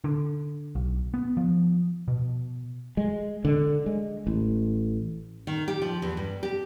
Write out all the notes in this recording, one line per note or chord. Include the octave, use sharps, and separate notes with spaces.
D3
B1
B3
F3
B2
G#3
D3
G#3
A1
D#3
G4
F3
E2
G2
G4